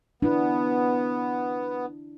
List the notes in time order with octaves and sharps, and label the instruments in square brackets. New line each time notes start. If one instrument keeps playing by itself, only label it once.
[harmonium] B3 [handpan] D4 E4